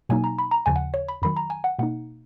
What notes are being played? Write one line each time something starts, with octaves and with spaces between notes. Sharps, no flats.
B2 F#3 A#3 D#4 G#5
A#5
B5
A#5
D#2 C#3 F3 G#5
F#5
C#5
B5
F2 D#3 F#3 B5
A#5
G#5
F#5
B2 A#3 D#4 F#5